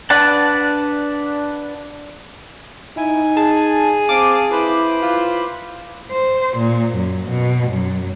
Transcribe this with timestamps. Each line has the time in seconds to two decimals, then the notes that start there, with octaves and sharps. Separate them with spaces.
0.10 D4 B4 D5 F#5 A5
2.97 D#4 E4 G#5
3.37 G#4 A5
4.09 C4 F5 A5 D6
4.52 E4 B4 C5
5.03 F4
6.12 C5
6.58 A#2
6.95 F#2
7.30 B2
7.71 F#2